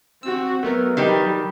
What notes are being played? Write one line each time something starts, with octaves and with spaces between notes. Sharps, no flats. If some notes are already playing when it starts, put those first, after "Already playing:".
C4 F#4 E6
F#3 A3 B3 A#4
D#3 G3 G4